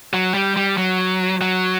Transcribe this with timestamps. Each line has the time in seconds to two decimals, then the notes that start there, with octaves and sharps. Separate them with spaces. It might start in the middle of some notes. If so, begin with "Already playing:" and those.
0.13 F#3
0.34 G3
0.56 G3
0.78 F#3
1.41 F#3